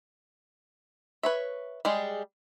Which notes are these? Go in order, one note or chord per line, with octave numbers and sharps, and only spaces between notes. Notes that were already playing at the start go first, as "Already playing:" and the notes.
B4 C#5 E5
G3 G#3 G#4